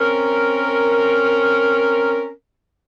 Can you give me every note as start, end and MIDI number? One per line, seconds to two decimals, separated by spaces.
0.01 2.31 60
0.01 2.31 61
0.01 2.31 70